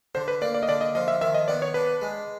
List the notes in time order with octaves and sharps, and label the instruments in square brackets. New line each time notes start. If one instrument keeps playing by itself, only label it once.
[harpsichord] D3 [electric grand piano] C5
[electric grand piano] B4
[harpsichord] A#3 [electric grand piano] D5
[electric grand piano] D5
D#5
[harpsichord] D3 [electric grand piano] D5
[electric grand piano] D#5
[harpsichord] F3 [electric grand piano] D#5
[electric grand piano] E5
[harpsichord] D#3 [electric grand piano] E5
[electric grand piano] D#5
[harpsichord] B3 [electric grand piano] D5
[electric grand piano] C#5
[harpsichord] D4 [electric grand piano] B4
[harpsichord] G#3